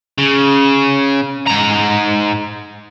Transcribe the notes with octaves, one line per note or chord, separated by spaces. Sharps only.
C#3
G#2 A#5